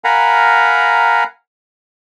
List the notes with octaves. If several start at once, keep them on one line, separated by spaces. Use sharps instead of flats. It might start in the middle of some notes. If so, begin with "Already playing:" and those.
A#4 F5 F#5 G#5 A#5 B5